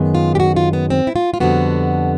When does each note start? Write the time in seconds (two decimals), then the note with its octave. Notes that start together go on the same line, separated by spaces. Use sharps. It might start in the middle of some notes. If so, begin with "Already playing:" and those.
Already playing: F#2 D#3 G#3 B3
0.15 F4
0.35 G4
0.40 F#4
0.56 F4
0.73 B3
0.90 C4
1.07 E4
1.16 F4
1.34 F4
1.40 F2 D3 G3 B3 F#4